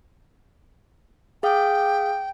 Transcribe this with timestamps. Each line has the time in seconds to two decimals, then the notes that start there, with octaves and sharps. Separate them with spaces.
1.43 G#4 F5 G5 D#6